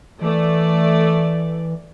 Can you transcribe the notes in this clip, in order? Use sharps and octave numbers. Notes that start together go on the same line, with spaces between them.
E3 A3 D5